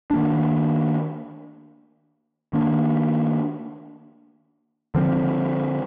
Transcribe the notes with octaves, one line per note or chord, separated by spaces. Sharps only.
D#3 A#3 D4
D#3 A#3 D4
D3 F3 C4